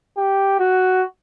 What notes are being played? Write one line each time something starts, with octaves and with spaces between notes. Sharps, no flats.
G4
F#4